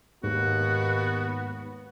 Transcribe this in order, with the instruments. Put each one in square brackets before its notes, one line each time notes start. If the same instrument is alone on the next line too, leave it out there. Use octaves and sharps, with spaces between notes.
[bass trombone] D#2 [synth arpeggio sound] G#2 [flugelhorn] B3 [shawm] F#4